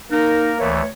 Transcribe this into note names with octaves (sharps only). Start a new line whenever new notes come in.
A#3 D#4 A#4
D2 E3 A3 C#5